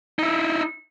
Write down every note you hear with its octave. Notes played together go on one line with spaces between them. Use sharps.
D#4 E4